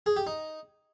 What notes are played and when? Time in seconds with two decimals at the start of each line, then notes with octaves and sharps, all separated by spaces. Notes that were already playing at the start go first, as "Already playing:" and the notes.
0.06 G#4
0.16 G4
0.27 D#4